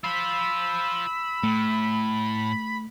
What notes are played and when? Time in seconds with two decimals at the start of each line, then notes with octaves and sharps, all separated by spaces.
0.04 F4 C5 B5 E6
1.43 A2 A3